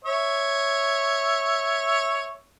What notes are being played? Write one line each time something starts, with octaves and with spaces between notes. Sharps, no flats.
C#5 E5